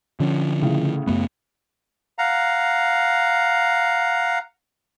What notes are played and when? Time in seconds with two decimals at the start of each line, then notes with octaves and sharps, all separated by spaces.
0.20 D3 F3 C#4
0.62 A2 C#3
1.07 F#2 A3 B3
2.19 F5 F#5 A#5